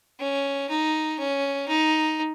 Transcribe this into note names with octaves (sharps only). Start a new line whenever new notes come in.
C#4
D#4
C#4
D#4